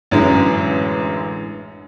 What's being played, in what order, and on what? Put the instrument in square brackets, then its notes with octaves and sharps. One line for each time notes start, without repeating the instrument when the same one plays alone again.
[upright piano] A1 F#2 D3 E3 G#3